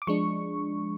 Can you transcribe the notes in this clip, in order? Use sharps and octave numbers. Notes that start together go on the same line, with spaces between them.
D6
F3 G#3 D4 C#6